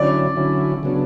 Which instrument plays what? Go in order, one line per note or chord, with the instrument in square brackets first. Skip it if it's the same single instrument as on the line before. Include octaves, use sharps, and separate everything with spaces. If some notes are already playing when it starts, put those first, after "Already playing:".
Already playing: [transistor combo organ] D3 F#3 C#4 E4 [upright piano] D5
[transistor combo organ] D3 F#3 C#4 E4
C#3 F#3 B3 D4